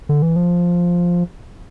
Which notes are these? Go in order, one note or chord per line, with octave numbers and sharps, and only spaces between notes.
D3
E3
F3